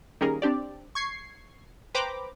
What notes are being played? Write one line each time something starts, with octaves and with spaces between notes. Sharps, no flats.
D#3 G3 A#3 C#4 G#4 A#4
C4 D4 G4 D5
C#6 G#6 C7
B4 C5 G5 A#5 B5 D6